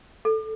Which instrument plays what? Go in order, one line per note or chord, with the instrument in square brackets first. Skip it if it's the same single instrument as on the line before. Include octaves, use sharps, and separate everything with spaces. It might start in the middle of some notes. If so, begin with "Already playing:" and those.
[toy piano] A4